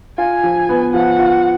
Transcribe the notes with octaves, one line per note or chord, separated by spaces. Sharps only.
F4 G#5
F3
B3
F3 F#5
F4